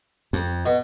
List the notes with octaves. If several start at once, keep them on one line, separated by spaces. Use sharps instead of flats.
F2
B2